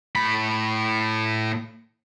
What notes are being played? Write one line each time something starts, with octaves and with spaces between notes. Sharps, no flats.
A2 B5